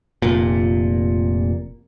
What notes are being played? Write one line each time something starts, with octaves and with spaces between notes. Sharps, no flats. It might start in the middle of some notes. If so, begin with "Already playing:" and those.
F1 A#2